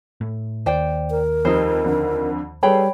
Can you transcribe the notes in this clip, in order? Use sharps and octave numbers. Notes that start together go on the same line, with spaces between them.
A2
D#2 C5 D5 G5
A#4
F2 G3 D#4 C5
F2 D3
G3 G#4 A4 B4 C#5 G5 B5